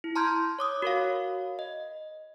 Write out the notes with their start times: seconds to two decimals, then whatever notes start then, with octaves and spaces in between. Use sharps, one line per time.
0.04 E4
0.16 A5 A#5 C6 F6 G6 G#6
0.59 C#5 D6 D#6
0.82 F#4 A#4 C#5 F5
1.59 D#5